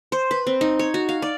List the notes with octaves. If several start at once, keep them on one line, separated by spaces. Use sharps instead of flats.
C5
B4
C4
D#4
C#5
F#4
F5
D5